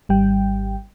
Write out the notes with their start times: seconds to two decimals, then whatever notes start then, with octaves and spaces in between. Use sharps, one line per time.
0.09 G#1 G3 G5